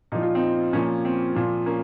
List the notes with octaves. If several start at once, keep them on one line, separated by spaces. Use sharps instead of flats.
A#2 F3 D#4
F4
C4 D#4
A#2 F3 A#3 C#4
C4
A#2 F3
A#3 C#4